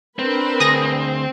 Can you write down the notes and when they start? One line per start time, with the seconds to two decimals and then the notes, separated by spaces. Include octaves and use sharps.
0.19 C4 D4 A#4 B4
0.60 D2 G#4 D#6 A#6